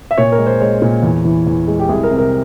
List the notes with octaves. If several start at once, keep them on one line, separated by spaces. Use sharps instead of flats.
E5
A#2 C#5
A#4
G#3
C5
G#3 C#5
A#2
E2
E3
E2
G#3
G4
C2 G#4
A#4
C3
A#4